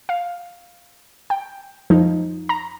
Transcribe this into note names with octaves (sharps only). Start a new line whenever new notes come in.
F5
G5
F2 F3 D#4
A#5